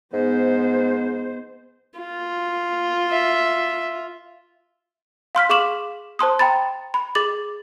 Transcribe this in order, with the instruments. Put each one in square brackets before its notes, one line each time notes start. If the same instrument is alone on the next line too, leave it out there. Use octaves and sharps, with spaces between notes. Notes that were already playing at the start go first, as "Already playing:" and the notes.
[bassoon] G#2 [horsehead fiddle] B3 C5
[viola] F4
[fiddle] E5
[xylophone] F5 C6 F6 B6
G#4 F5 C#6 D6 E7 F#7
C5 A5 C6 D#6
G5 A#5 B5 A6
B5
G#4 D6 A6 F#7